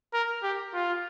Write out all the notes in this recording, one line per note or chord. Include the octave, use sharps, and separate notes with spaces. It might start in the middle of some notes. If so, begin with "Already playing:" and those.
A#4
G4
F4